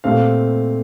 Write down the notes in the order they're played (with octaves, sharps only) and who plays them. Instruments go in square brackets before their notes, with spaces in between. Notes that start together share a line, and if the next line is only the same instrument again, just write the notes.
[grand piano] A#2 A3 C4 F5